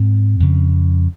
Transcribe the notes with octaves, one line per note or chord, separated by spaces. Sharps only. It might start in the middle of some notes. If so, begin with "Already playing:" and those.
Already playing: G#2 C4
F2 C#3